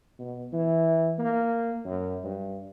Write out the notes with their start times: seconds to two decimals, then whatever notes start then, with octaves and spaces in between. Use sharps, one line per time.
0.20 B2
0.53 E3
1.19 A#3
1.86 F#2
2.24 G2